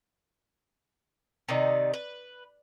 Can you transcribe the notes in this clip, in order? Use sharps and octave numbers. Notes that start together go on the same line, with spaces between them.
C3 D#3 D#4 D5
B4